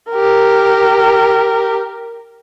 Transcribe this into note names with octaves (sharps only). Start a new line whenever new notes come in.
G4 A#4